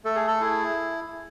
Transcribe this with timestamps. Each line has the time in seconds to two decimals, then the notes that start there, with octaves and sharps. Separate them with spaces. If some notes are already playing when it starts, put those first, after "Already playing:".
0.05 A3 A4
0.16 G#4
0.27 A4
0.41 E4 G#4